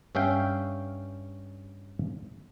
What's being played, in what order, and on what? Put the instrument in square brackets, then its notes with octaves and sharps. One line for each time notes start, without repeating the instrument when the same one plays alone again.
[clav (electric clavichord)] G2 C#4 E5 F5 G5